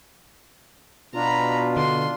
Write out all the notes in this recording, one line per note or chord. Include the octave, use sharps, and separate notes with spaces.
B2 D4 F4 A#5 B5
D3 C6